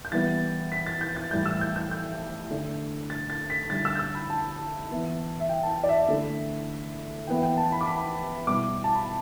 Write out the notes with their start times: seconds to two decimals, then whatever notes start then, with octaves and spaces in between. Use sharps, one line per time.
0.05 G6
0.12 E3 G3 B3 A6
0.72 B6
0.86 A6
1.01 G6
1.16 A6
1.31 A2 E3 G3 E4 G6
1.46 E6
1.61 G6
1.76 G6
1.91 G6
2.50 D3 A3 D4
3.10 A6
3.30 A6
3.50 B6
3.70 D3 G3 E4 A6
3.85 E6
3.95 G6
3.99 E6
4.15 B5
4.30 A5
4.89 E3 B3 E4
5.40 E5
5.49 G5
5.63 A5
5.69 G5
5.83 D5
5.89 E5
6.08 D3 A3 E4
7.27 E3 B3 E4 G5
7.43 G5
7.57 A5
7.72 B5
7.81 D6
7.87 B5
8.47 B2 G3 E4 D6
8.84 A5
8.95 B5